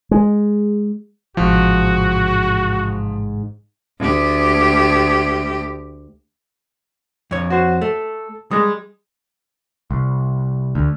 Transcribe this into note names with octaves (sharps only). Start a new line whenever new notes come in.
G#3
A1 G#2 C3 F3 F#4
D2 G4
F2 C#5
F#4 C5
A3 A4
G3 G#3 D#6
C2
D2